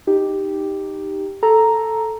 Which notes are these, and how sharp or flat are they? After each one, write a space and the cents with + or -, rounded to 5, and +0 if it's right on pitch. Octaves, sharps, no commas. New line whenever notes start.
D#4 -5 G4 +0
A4 +0 A#5 +0